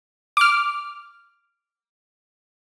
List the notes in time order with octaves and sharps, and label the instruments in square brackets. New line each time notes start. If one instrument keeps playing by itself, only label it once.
[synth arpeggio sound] D6 F6